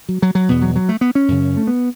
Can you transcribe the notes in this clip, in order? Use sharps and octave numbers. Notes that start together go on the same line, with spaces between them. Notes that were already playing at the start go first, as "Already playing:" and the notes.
F#3
F#3
F#3
E2 B2 B3
F#3
F#3
A3
B3
C#4
F#2 C#3
A3
B3